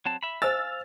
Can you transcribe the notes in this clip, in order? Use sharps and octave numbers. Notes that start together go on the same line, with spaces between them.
F#3 C4 A5
E5 B5
C5 F5 G#5 E6 A6